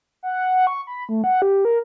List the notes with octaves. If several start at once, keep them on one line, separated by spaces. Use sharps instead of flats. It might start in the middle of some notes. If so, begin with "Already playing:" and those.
F#5
C#6
B5
A3
F#5
G4
A#4